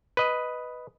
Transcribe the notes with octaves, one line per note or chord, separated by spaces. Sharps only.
B4 D#5